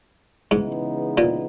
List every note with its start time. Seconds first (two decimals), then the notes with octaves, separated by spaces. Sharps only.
0.51 G#2 C#3 E3 G#3 B3 D#4
1.18 A#2